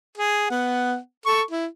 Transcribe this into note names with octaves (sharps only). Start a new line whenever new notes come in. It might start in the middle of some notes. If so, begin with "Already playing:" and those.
G#4
B3 F#5
A4 C#6
E4